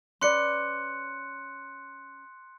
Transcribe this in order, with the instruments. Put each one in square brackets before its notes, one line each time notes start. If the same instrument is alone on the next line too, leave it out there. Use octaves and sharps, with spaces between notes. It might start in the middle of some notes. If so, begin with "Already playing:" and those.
[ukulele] C#4 B4 D5 [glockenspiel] C6 F#6 C#7